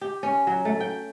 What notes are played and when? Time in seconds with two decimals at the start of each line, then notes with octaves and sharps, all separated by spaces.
0.01 G4
0.23 C#4
0.47 F#3
0.65 A3
0.80 G5